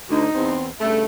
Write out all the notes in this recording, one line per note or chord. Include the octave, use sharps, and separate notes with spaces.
D2 D#4
E2 C4
G2 C#3 A3 E5